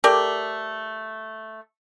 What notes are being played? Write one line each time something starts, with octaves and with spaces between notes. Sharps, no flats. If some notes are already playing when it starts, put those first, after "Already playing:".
A3 G4 A#4 D5